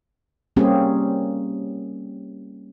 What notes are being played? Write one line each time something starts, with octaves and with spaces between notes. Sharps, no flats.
G3 A#3 C4 C#4 G4 G#4